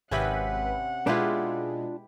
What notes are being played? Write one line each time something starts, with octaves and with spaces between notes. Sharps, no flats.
G#1 C3 C4 C#4 B4 F#5 B5
B2 G#3 D4 E4 F4 G4 B4